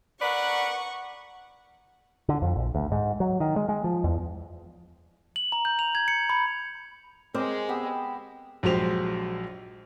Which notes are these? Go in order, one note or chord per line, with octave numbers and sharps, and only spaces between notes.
A#4 B4 D5 F#5 C#6
D3
F2
A#1
D2
G#2
F#3
D#3
G#3
G#3
F3
E2
F#7
A#5
G6
F7
G#6
C#7
B5
G#3 C4 G#4 A#4 C5 D6
B3 G4 E6
A#1 F#3 G#3 G4 C5 F7